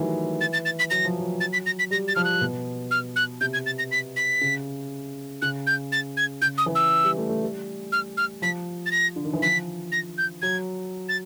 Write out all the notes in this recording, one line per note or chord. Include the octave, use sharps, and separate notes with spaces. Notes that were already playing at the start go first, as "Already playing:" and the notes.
Already playing: D#3 E3 F#3 G3 A3
A6
A6
A6
B6
F#3 A#6
F3
F#3
A6
B6
A#6
B6
G3 A#6
A6
F3 F6
F#6
B2
F6
F#6
C3 G6
G#6
A6
A#6
B6
B6
C#3
C#3 F#6
G6
A6
G#6
C#3 G6
D#6
E3
E6
G3
A3
A3
G3
F6
F6
F3 B6
A6
A#6
D3
D#3
E3
F3 B6
A#6
G6
F#3 G#6
A6